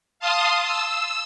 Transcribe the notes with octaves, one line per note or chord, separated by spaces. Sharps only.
F5 A5 C6 D#6
E6